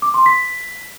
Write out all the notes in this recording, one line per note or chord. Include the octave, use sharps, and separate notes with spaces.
D6
C6
B6